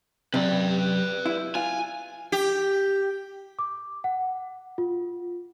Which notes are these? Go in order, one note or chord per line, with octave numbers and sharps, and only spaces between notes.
F#2 C3 B4 D5
E4
F4 G#5
G4
D6
F#5
F4